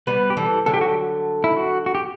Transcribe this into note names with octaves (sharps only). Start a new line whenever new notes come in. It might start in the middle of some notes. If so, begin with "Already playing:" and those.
G3 B3 B4
G4
E3 G3 A4
D3 F#3 A4
G4
F#4
G4
E4
F#4
F#4
G4